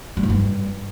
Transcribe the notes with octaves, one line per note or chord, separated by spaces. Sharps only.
G3
G#2
G2